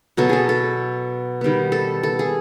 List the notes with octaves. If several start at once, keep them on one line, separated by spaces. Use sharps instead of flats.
B2 F#3 B3 A4
G#4 A4
A4
D#3 G3 B3
A4
A4
G#4